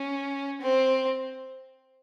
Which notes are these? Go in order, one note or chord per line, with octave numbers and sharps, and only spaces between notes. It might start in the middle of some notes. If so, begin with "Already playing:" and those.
Already playing: C#4
C4